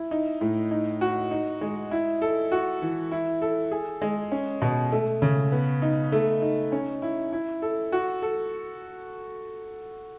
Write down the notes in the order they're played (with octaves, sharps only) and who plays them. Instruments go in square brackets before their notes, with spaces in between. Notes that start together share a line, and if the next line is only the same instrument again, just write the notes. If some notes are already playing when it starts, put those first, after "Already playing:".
Already playing: [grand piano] E4
D#4
A2
D#4
F#4
D#4
G#3
E4
A4
F#4
E3
E4
A4
G#4
G#3
C#4
B2
A3
C#3
B3
D#4
A3
D#4
C#4
E4
E4
A4
F#4
A4